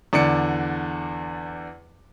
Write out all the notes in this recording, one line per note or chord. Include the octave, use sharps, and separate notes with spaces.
E2 D3 D5 D6 C#7